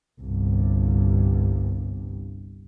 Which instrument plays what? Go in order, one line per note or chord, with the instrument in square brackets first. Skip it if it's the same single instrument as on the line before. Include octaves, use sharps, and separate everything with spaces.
[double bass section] G1 C2 G2